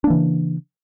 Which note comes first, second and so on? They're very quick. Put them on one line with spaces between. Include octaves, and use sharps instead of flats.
D4 A#3 E3 C#3